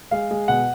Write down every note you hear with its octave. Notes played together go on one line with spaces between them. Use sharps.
G#3 F5
G#3
B2 F#5